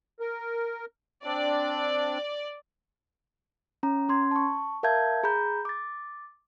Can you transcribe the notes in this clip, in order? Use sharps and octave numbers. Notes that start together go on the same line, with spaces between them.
A#4
C4 D4 D5
C#4 A#5
C#4 C6 G#6
A5 C#6
A#4 E5 F5 A5 G6 G#6
G#4 A#5 B5 G6
D6 A6